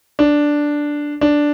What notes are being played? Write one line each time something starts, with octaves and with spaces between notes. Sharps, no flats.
D4
D4